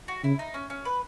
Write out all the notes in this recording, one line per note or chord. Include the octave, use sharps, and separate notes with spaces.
F#4
C#3 E4
D#4
C#4
C#4
B4